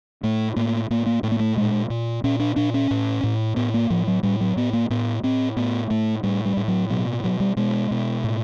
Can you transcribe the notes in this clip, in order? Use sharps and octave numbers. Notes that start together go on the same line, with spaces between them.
A2 A3
A2 A#3
A2 A#3
A#3
A2 A3
A#3
A3
A#2 G#3
A#2
A#2 C#4
D4
A#2 D4
C#4
A2
A2
A2 B3
A#3
A2 F3
F#3
A2 G3
F#3
A2 B3
A#3
A2 B3
A2 C4
A2 B3
A2 A3
A2 G3
G3
A2
F#3
B2 F#3
B2 F#3
G3
B2 G#3
B2
A2